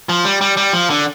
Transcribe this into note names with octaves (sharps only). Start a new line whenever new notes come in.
F3
G3
G3
G3
F3
D3